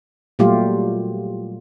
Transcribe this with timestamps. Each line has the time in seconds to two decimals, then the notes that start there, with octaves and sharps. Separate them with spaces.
0.39 A#2 F#3 G3 A3 F4 G4